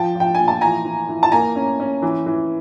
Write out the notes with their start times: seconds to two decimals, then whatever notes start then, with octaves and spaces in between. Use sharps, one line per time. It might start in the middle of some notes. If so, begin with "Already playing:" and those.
Already playing: F3 G5 A5
0.15 F3 G5
0.35 A#2 G#5
0.48 A5
0.61 E3 G#5 A#5
0.85 E3
1.09 E3
1.23 A5
1.32 A#3 G#5 A#5
1.56 C#4
1.80 C#4
2.02 E3
2.26 E3